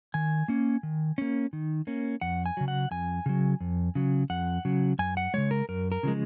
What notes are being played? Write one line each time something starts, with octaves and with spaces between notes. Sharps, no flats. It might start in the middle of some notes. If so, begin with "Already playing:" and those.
D#3 G#5
A#3 C#4
D#3
A#3 C#4
D#3
A#3 C#4
F2 F#5
G#5
C#3 F#3
F#5
F2 G#5
C#3 F#3
F2
C#3 F#3
F2 F#5
C#3 F#3
F#2 G#5
F#5
C#3 F3 G#3 C#5
A#4
F#2 A#4
A#4
C#3 F3 G#3